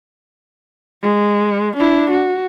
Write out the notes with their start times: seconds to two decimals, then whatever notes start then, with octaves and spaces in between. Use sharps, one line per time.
1.02 G#3
1.76 D4 E4
2.11 F#4